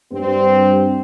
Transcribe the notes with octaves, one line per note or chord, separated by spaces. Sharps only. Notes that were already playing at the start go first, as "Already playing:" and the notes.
G2 C4